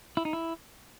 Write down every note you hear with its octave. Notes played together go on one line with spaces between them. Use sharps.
E4
D#4
E4